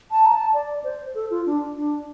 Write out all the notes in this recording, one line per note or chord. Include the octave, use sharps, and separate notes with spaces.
A5
A#5
A5
D5
C5
A4
F4
D4
D4